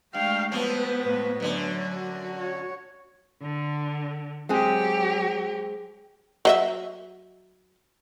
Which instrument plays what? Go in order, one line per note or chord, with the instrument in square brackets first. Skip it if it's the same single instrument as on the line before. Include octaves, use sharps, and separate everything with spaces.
[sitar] G2 [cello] G#3 A3 [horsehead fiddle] F5 G5
[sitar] F3 F#3 C4 [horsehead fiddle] B3 B4
[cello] A2 G#3
[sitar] F#2 D3 [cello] F#3
[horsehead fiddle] F#4
[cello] C#5
D3
[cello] F#3 G4 [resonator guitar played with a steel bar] G#3 C4 G#4
[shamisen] F#3 D#5 E5